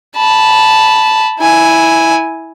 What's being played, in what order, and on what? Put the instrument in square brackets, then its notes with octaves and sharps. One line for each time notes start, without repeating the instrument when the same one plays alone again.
[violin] A5 B5
E4 G#5